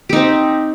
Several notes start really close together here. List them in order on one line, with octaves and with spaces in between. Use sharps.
G4 D#4 C4